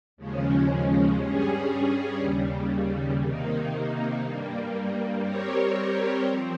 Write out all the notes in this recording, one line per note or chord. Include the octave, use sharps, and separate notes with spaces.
D#2 C#3 F3 G#3 C#4
G2 G3 C#4 G#4
D#2 C#3 G3
C3 D#3 A#3 D#4
G2 G3 A#3
G3 C4 G4 A#4 C#5
F3 C4